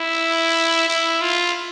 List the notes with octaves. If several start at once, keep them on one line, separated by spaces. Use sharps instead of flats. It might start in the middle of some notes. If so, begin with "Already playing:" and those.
Already playing: E4
E4
F4